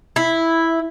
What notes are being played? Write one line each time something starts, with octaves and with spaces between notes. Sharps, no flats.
E4